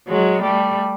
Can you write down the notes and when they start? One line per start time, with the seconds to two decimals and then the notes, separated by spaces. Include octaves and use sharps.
0.09 F#3 G#3
0.41 G3 A3